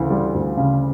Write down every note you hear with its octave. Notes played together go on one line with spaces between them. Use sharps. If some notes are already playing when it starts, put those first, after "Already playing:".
Already playing: D2 C#3 E3
G3
D2
C#3